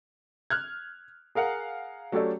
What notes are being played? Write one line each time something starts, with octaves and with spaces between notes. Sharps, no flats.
F6 F#6 G#6
G#4 A#4 F5 F#5
F#3 A3 C#4 G4 A4 D5